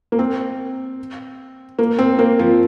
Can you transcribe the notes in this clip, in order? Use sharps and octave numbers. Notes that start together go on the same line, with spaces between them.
A#3
C4
A#3
C4
A#3
F3